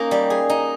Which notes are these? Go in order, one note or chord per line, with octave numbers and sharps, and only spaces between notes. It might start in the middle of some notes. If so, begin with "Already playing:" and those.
Already playing: A#3 C#4 D#4
G3
G#4
D#4